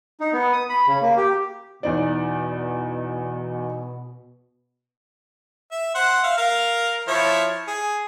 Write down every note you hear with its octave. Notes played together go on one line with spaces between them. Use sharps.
D#4
B3
D#6
B5
C#3
A#3
G4
E2 B2 D#4 D5
E5
C5 F#5
E5 F5
A#4 F5
F3 E4 C#5
G#4